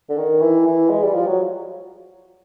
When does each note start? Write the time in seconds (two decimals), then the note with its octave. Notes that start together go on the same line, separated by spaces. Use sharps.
0.09 D3
0.17 D#3
0.41 E3
0.67 E3
0.90 G#3
1.03 G3
1.14 F3
1.27 F#3